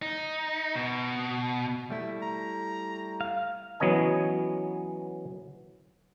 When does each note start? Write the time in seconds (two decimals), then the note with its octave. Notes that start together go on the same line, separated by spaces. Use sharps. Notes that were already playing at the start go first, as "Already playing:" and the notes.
0.02 D#4
0.75 B2
1.90 G3 A3 E4 E5
2.22 A#5
3.21 F5
3.80 E3 F#3 B3 C#4 D#5 G#5